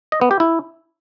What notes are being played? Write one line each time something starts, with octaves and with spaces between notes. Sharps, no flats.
D#5
B3
G4
E4